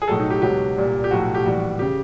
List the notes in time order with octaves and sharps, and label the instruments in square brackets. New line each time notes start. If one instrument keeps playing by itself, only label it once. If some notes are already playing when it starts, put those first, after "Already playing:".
[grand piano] G#4
B1 A2 F#3 A4
D#4
G4
C#2 B2 F#3 G4
C2 A#2 G3
G4
B1 A2 F3 F#4
G4
A#1 A2 E3 G3 F#4
C#3 G4